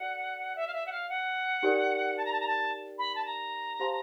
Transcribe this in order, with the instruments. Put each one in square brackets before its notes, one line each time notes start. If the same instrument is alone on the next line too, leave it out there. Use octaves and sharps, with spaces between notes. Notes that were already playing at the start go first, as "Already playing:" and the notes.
Already playing: [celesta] F#4 A4 D5 [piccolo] F#5
[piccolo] E5
F5
E5
F#5
F5
F#5
[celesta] D#4 G4 A#4 D5 G5
[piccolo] A5
A#5
A5
A#5
A5
B5
A5
A#5
[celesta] G4 C5 F5 A5 C6